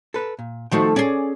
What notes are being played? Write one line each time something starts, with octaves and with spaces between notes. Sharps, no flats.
A4 B4
A#2
D#3 F3 A3 F#4 G5
C#4 G#4 D5